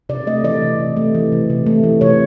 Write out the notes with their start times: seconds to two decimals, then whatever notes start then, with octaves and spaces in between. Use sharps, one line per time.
0.09 C3 D5
0.27 A3 D#5
0.44 E3 D5
0.62 C3
0.79 C3
0.97 A3
1.15 E3
1.32 C3
1.50 C3
1.66 A3
1.84 E3
2.01 C3 C#5